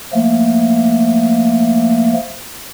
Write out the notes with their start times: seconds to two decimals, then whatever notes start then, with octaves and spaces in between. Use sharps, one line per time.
0.13 F3 A3 A#3